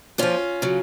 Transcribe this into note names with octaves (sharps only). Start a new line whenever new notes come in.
A#2 F3 C#4 F4
C#3 F#3